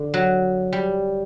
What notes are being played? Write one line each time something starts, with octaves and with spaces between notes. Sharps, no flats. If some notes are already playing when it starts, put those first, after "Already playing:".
Already playing: D3
F#3
G3